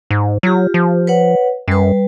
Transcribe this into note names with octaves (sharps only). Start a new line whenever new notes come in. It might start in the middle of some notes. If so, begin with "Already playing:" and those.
G#2
F#3 F4 G4
F3
B4 C#5 F#5
F#2 G3 B4